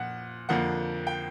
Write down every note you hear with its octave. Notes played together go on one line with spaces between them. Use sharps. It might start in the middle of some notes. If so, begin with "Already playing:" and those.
Already playing: A#2 F3 F#5
F2 D3 F3 A#3 F#5
G5